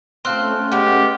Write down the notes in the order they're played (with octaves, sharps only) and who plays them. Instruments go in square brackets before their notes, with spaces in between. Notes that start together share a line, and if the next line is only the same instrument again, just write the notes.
[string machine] A3 C#4 [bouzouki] C4 F4 A4 [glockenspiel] C6 F6 F#6
[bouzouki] G#3 B3 [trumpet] G4